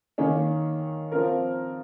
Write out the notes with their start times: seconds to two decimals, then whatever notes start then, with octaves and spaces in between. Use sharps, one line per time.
0.18 D#3 A#3 C#4
1.12 F3 C4 F4 A#4